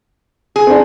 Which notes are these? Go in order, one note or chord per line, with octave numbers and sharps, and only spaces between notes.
G#4
C4 D4